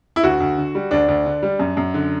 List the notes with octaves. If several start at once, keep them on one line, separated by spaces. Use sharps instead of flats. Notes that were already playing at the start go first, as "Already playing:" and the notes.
E4
D2 F#4
D2
D3
G3
D2 D4
D2
D3
G3
F#2
F#2
D3